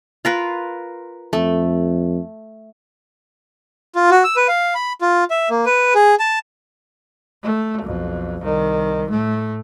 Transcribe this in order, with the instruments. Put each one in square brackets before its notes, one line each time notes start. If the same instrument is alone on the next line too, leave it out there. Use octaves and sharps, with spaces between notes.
[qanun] F4 A#4 B4
[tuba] F2 [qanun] A3
[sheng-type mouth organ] F4
F#4
E6
B4
F5
B5
F4
E5
A#3
B4
G#4
A5
[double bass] A3
B1 F2
C2 D#3
A2 A3